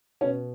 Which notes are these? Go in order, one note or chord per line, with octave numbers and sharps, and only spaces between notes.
B2 C#4